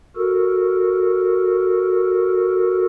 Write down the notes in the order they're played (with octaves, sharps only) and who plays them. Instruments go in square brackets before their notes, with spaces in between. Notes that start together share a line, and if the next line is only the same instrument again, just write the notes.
[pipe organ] F#4 A4 A#4